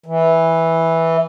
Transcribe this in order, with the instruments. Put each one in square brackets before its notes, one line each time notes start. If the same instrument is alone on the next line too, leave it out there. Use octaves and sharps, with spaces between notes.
[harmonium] E3